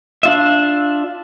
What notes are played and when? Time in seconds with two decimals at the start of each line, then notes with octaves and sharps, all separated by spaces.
0.23 D4 F4 E5